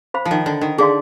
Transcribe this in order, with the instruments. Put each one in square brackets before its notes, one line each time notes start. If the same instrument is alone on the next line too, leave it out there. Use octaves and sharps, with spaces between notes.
[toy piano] C5 F5 B5
[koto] F3
D#3
D3
D#3
[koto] D3 [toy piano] D#4 G#4 D5 F5 C6